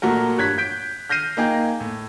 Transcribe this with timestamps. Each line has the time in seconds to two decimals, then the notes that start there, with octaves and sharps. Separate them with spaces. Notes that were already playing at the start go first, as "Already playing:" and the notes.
0.02 A#2 F#3 A3 F#4 A#4
0.37 G2 C#5 F#6 G#6 B6
0.58 G6 B6 D7
1.10 F6 G6 A#6 C7 D#7
1.37 A#3 D#4 G#4 G5
1.80 A2